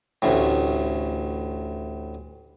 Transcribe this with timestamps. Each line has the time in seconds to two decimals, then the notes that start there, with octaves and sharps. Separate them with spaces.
0.22 A1 D2 A2